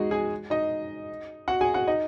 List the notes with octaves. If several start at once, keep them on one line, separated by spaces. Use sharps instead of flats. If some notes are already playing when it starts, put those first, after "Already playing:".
Already playing: G#3 D#4 F#4 G#4
G#4 G#5
D#4 D#5
F#4 F#5
G#4 G#5
F#4 F#5
D#4 D#5